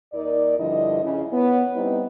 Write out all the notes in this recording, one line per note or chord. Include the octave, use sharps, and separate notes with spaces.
D#2 D#4 A#4 D5
G2 D3 F3 E4 D#5
C#3 E4
B3 C#5
G3 C4 D#4 E4 G4 B4